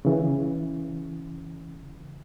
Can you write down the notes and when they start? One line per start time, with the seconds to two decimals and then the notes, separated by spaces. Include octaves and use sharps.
0.05 C#3 E3